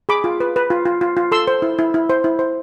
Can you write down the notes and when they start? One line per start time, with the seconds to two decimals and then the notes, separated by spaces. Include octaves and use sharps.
0.09 G#4 B5 D6
0.24 F4
0.40 B4
0.56 B4
0.70 F4
0.85 F4
1.01 F4
1.17 F4
1.32 A4 C6 E6
1.48 C5
1.62 E4
1.79 E4
1.94 E4
2.10 C5
2.24 E4
2.39 C5